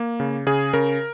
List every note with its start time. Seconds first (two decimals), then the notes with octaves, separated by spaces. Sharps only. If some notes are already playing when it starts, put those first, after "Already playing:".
Already playing: A#3
0.20 C#3
0.46 C#3 G#4
0.73 C#3 A#4